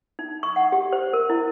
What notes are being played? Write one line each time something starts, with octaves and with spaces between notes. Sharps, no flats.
D#4
C#6
F#5
G4
C5
A#4
E4